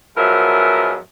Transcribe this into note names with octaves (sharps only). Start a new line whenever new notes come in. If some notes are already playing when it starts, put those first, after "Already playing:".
G#2 F3 F#3 B3 A#4 E5